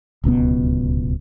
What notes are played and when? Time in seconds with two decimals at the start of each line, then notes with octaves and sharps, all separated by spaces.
0.24 D1 C#2 B2 B3